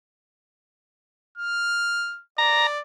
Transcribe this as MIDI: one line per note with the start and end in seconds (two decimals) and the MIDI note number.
1.38 2.22 89
2.38 2.81 74
2.38 2.67 82